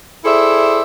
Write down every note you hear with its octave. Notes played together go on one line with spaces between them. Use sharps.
E4 G#4 A4 C5 D5 E5